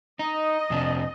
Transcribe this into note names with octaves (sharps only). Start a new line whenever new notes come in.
D#4 D#5
F2 C3 D4